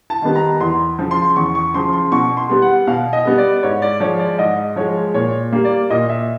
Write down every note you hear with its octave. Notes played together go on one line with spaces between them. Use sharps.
A5
D#3 G3 B3
A#5
E2 C6
C#3 F3
C6
E2 C#6
C#6
C#3 F3 C6
C6
B2 C#6
C6
G3 B3
F#5
B2 F5
D#5
G3 B3
D5
G#2 C#5
D5
F3 G#3 C#5
D5
G#2 D#5
F3 G#3 C#5
A#2 C#5
G3 A#3
D5
A#2 D#5
E5